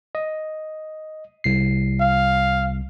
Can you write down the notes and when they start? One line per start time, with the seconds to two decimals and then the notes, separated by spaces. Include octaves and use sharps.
0.15 D#5
1.44 C2 C7
2.00 F5